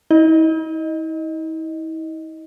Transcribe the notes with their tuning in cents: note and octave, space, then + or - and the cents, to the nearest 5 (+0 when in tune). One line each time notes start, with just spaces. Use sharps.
E4 -45 D#5 +0